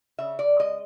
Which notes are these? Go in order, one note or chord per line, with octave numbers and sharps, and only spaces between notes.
C#3 E5
D5
G#3 D#5